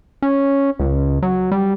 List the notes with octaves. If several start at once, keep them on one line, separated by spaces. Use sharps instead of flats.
C#4
C#2
F#3
G3